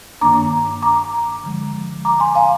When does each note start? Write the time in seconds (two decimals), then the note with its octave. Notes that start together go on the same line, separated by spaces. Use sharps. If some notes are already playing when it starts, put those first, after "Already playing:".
0.21 G2 D#3 A#3 D4 A#5 D6
0.83 A#5 D6
1.44 D3 F3 G#3
2.05 A#5 D6
2.20 G#5 C6
2.35 F5 G#5